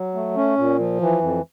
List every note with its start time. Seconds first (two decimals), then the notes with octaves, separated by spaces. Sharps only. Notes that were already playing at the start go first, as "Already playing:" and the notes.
Already playing: F#3
0.15 A3
0.37 C#4
0.58 A#2
0.79 F3
1.01 E3
1.22 F2